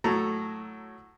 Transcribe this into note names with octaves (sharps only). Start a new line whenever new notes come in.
A2 F#3 A4 A#5